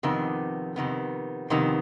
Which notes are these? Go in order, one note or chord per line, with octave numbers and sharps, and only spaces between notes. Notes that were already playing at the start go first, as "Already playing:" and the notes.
F2 C3 D#3 B3
F2 C3 D#3 B3
F2 C3 D#3 B3